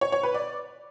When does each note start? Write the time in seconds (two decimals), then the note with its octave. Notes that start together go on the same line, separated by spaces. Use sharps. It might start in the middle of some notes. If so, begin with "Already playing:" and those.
0.01 C#5
0.12 C#5
0.23 B4
0.34 D5